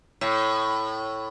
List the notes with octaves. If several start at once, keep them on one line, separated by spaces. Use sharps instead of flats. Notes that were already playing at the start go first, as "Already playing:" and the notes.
A2